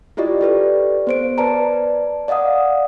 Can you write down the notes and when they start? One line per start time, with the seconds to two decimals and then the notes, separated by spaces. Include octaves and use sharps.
0.17 E4 F4 G4 D5 D#5
0.41 G4 A4 B4 D5
1.07 B3 C5 D7
1.38 B4 D5 A5 A#5
2.28 D5 D#5 F5 F#5 D#6